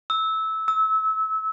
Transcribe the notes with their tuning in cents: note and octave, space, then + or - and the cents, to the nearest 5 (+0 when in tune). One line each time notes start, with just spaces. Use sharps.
E6 -15
E6 -25